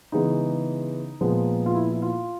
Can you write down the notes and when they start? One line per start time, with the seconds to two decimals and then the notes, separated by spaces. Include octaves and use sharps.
0.12 C#3 E3 G#3 B3 D#4
1.21 A#2 F3 G#3 B3
1.66 F4
1.75 E4
1.91 E4
2.02 F4